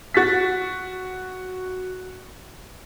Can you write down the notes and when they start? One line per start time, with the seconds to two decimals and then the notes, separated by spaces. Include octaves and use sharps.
0.14 F#4 A6 B6